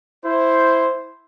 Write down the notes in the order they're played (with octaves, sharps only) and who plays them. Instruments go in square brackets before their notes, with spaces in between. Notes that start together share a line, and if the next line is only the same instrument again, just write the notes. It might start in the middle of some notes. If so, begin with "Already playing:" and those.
[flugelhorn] E4 [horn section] C5